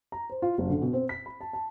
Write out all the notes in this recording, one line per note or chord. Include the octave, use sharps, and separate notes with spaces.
A#5
C5
F4
F#1
D3
B2
C4
B6
B5
A5
A5